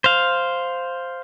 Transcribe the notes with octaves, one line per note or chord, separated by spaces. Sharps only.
C5 F5